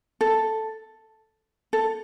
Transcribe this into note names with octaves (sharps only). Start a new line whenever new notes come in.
A4
A4